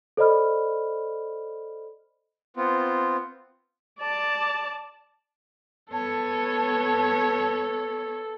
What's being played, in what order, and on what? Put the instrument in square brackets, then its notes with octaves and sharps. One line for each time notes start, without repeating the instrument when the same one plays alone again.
[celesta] A4 C5 D5 D#5 B5 F6
[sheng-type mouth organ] B3 C4 F4
[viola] D5 A5
[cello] B3 C#5 [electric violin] A4 [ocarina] A5